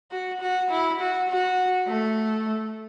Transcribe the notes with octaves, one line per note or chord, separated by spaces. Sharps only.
F#4
F#4
E4
F#4
F#4
A3